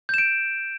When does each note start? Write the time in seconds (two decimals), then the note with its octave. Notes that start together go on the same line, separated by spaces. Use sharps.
0.09 G6
0.14 E7
0.18 D7